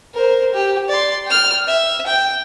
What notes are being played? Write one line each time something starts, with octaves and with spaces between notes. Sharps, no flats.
A#4 C5
G4
D5 C6
G5 F6
E5
G5